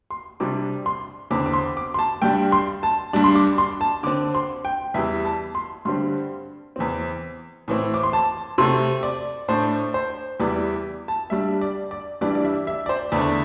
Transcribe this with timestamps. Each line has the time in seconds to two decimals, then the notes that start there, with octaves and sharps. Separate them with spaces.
0.10 C6
0.40 C3 G3 D4 D6
0.86 C6
1.30 E2 D3 C4 D6
1.46 D6
1.53 C6
1.77 D6
1.94 C6
1.99 A5
2.22 G2 G3 D4 G5
2.52 C6
2.83 A5
3.13 G2 G3 D4
3.24 C6
3.35 D6
3.58 C6
3.81 A5
4.03 D3 C4 D6
4.35 C6
4.65 G5
4.94 E2 E3 G3 E5
5.25 A5
5.55 C6
5.85 G2 D3 G3 C4 C6
6.76 E2 E3 C4
7.68 A2 E3 C4
7.94 D6
8.03 C6
8.13 A5
8.58 C3 A3 C4 C6
9.03 D5
9.48 A2 A3 D4 C5
9.94 C5
10.40 E2 E3 G3 D5
11.08 A5
11.30 G2 G3 D4 E5
11.61 D5
11.91 D5
12.21 G2 E3 G3 D4 D5
12.35 D5
12.45 E5
12.67 E5
12.86 D5
12.89 C5
13.12 E2 D3 A3 D5